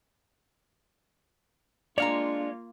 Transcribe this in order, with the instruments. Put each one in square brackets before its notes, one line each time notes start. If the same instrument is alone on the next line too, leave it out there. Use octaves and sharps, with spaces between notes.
[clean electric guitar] G#3 C#5 [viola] A#3 F4 [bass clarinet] D4 [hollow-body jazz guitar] D5 F5 A#5